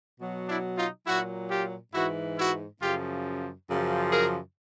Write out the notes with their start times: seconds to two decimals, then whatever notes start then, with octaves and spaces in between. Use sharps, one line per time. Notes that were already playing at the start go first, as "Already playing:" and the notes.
0.19 B2 F#3
0.48 D4 E4
0.77 D#4 F4
1.07 A#2 F#3 E4 F#4
1.50 F4 G4
1.94 G#2 E3 E4 F#4
2.38 E4 F#4
2.81 F#2 C#3 F3 F4 G4
3.69 F#2 C#3 F3
4.12 G#4 A#4